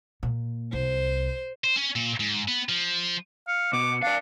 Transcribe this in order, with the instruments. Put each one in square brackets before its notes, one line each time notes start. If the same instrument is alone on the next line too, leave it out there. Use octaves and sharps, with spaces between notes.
[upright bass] A#2
[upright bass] C2 [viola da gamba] C5
[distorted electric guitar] C5
C#4
A#2
G#2
B3
F3
[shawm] F5 [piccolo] C#7
[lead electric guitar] B2 [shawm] D6
[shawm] D4 [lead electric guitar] D5 F5